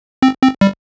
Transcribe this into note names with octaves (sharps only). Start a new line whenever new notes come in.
C4
C4
G3